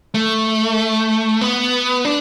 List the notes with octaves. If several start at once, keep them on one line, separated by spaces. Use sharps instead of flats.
A3
B3
D4